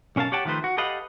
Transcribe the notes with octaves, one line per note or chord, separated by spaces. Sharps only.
B1 C#4 A#4 F5 A5
G4 C#5 F#5 G5 A5
D#3 F3 A3 C#4 B4 C5
F#4
G4 A4 B4 D#5 F5 F#5